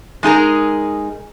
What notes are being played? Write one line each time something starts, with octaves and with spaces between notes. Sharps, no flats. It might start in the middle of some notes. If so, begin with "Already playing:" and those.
G#3 D#4 G#4 A#4